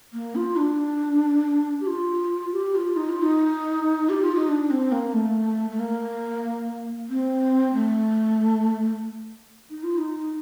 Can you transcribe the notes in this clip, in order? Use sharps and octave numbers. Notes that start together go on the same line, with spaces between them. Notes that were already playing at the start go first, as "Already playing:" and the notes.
A#3
F4
D4
G4
F4
G4
F4
D#4
F4
D#4
G4
F4
D#4
D4
C4
A#3
A3
A3
A#3
C4
A3
D#4
F4
D#4